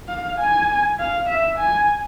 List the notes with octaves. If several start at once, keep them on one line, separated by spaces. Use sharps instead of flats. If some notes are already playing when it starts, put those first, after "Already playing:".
F5
G#5
F5
E5
G#5